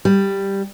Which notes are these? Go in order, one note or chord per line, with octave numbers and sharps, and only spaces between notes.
G3